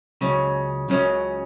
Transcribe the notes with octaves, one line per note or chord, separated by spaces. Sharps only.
C#2 C#3 F#3 C#4
C#2 C#3 F#3 C#4